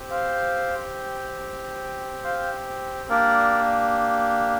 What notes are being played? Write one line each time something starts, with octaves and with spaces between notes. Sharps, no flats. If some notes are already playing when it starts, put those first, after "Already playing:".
Already playing: C4 G4
C5 F5
C5 F5
A#3 D4 G4 A#4 D5